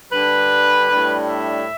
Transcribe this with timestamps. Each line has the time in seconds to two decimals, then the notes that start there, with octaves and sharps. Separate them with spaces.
0.12 D3 G3 D4 B4
0.89 A2 G3 D4
1.27 E5